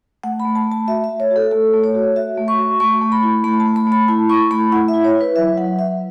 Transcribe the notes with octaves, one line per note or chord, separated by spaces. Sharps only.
A3 F#5
B5
A3
A5
A3 A5
F#4 E5
E5
A3
C#5
F#4
A4
A3 A4
A3
C#5
F#4
F#4 E5
A3
C#6
F#4
A3 C#6
A3
B5
E4
A3 B5
A5
A3
B5
A3
B5
E4 A5
E4 C#6
A3 B5
E4 F#5
E5
E4
C#5
E4
B4
F#3 E5
F#3 F#5
F#3 E5